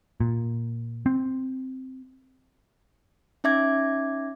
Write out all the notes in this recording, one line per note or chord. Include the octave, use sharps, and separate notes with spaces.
A#2
C4
C#4 D#4 E5 D6 G#6